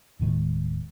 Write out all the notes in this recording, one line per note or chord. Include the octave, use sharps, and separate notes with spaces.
D#1 A2 D#3 G#3